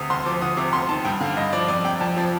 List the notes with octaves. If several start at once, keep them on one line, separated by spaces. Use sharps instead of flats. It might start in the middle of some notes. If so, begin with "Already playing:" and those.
Already playing: D2 C3 D#6
D2 C6
F3 D6
D2 D#6
C3 D6
D2 C6
D#3 A5
G2 G5
D3 F5
G2 D#5
F3 D5
F2 D5
C3 G5
F2 A5
F3